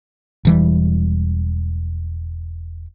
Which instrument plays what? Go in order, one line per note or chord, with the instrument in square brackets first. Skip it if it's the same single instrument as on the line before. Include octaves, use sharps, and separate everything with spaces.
[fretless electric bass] E1 E3 G3